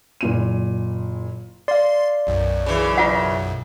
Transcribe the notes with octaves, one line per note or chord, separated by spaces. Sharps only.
F#1 A#2 D#7
D5 F5 C6
B1 F#2
C#3 E3
F4 F#5